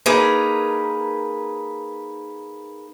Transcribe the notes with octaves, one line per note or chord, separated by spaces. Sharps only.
A#3 D#4 G#4 A#4 B4